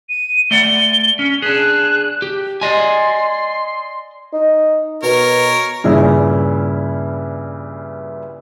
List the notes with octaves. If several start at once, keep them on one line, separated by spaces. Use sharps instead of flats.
D#7
A3 D5 F#5 G7
C#4
D4 G#4 F#6
G4
D5 D#5 G#5 C6
D#4
B2 A#4 C#5
G2 A#2 C#3 E4